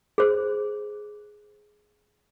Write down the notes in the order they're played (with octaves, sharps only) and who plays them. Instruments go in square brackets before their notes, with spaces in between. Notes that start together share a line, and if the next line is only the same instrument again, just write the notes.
[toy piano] G#4 C5